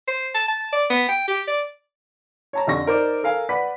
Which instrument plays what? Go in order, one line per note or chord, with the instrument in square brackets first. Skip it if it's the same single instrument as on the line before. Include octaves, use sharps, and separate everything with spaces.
[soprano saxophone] C5
A5
A5
D5
B3
G5
G4
D5
[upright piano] C#5 A5 A#5
F2 D3 G4 C#6 A#6
D#4 A#4 C5 D5
A4 A#4 F5 G#5
B4 D5 F#5 B6